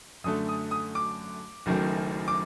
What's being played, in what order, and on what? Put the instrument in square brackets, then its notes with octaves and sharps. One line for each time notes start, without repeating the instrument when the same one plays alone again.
[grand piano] F#2 D3 A3 D#6
D#6
D#6
D6
F#1 F#2 D#3 A3
D6